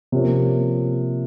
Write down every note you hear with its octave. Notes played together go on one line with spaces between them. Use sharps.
C3 F3 A#3 C#4